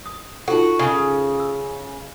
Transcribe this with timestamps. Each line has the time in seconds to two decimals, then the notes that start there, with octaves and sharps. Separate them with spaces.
0.06 D#6
0.48 D#4 F4 F#4 A4
0.79 C#3
1.40 E6